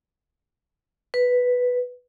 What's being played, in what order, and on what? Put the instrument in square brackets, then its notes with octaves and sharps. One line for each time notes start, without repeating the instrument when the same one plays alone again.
[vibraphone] B4